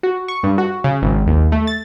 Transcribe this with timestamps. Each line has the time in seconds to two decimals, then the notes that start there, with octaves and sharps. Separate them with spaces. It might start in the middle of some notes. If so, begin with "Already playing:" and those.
0.03 F#4
0.28 C#6
0.43 G2
0.58 F#4
0.84 C#3
1.02 G#1
1.27 D#2
1.52 A3
1.67 A6